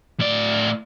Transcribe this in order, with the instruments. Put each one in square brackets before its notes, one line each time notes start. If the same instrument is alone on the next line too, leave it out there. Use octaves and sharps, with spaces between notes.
[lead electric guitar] A2 D5